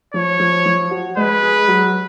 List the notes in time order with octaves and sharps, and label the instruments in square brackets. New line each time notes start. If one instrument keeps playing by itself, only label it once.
[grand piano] F3 [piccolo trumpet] C#5
[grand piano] F3
F3
F#4
[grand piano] G#3 [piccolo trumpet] B4
[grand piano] G#4
F#3